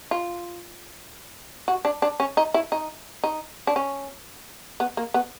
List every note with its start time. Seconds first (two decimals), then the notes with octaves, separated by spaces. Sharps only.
0.11 F4
1.68 F#4
1.85 D4
2.02 D4
2.20 C#4
2.37 D#4
2.54 E4
2.72 D#4
3.24 D#4
3.67 D4
3.76 C#4
4.80 B3
4.97 A#3
5.14 B3